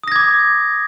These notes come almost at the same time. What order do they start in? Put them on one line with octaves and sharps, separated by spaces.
D#6 A#6 G#6 D6